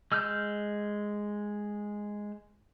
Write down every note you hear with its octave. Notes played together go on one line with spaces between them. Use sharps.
G#3 E6 F6 G6